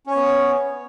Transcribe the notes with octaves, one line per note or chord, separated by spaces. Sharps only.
B3 C#4 C#5